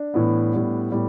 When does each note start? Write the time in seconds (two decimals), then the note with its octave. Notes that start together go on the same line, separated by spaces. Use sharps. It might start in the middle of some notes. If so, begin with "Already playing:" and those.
Already playing: D4
0.14 A2 E3 B3
0.53 A2 G3 B3
0.91 A2 G3 B3